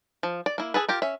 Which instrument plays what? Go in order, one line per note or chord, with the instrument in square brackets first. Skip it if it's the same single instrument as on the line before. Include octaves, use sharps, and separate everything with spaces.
[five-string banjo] F3
D5
A#3 E4
G#4 A4 B4
F4 G4 A#4
C#4 E5